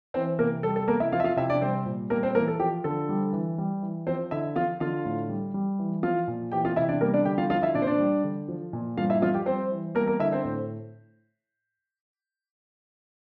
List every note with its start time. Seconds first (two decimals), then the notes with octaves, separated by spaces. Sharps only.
0.14 E3 C4 C5
0.39 C3 A#3 A#4
0.63 G3 A4
0.76 A4
0.88 C3 A#3 A#4
1.00 E4 E5
1.12 F3 F4 F5
1.20 E5
1.24 F4 F5
1.37 C3 E4 E5
1.50 D4 D5
1.62 G3 C4 C5
1.86 A#2
2.10 G3 A#3 A#4
2.23 C4 C5
2.35 E3 A#3 A#4
2.48 A4
2.59 F3 G4
2.84 D3 A4
3.09 G3
3.33 E3
3.58 G3
3.82 E3
4.07 F3 C4 C5
4.31 D3 E4 E5
4.55 F3 F4 F5
4.80 D3 F4 F5
5.05 A2
5.29 G3
5.54 G3
5.79 E3
6.03 F3 F4 F5
6.28 A#2
6.52 E3 G4 G5
6.65 F4 F5
6.76 C3 E4 E5
6.89 D4 D5
7.01 G3 A#3 A#4
7.13 D4 D5
7.25 D3 G4 G5
7.38 F4 F5
7.50 F3 F4 F5
7.62 E4 E5
7.75 A#2 D4 D5
7.82 C5
7.87 D4 D5
7.99 G3
8.24 D3
8.48 F3
8.73 A#2
8.97 G2 F4 F5
9.10 E4 E5
9.22 F3 F4 F5
9.34 G4 G5
9.46 G3 C4 C5
9.71 E3
9.95 G3 A#3 A#4
10.07 A#3 A#4
10.20 D3 E4 E5
10.32 C4 C5
10.44 A2